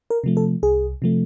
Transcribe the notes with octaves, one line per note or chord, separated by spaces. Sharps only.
A#4
C3 F3 A3
A4
C2 G#4
C3 F3 A3